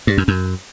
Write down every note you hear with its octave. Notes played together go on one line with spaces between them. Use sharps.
G2
F#2
F#2